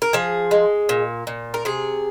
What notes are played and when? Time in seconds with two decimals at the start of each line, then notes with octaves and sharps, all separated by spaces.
0.02 A#4
0.13 F3 G#4
0.51 G#3
0.89 A#2
1.27 A#2
1.54 A#4
1.65 C3 G#4